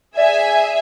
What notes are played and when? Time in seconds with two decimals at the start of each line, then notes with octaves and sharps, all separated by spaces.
0.17 G#4 D5 E5 G#5